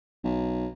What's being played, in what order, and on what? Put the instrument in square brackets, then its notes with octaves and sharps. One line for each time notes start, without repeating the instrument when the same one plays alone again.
[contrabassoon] B1